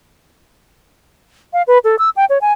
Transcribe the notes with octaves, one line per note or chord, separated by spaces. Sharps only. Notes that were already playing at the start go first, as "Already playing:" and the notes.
F5
B4
A4
E6
G5
C#5
G#5